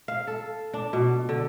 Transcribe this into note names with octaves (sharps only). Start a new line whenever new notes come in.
F5
A4
D4
B2
D3